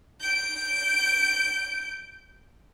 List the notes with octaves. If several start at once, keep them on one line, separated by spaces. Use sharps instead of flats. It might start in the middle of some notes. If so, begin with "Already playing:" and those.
G6 D7